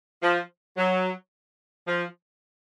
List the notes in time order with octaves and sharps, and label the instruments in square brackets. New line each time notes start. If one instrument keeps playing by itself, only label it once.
[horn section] F3
F#3
F3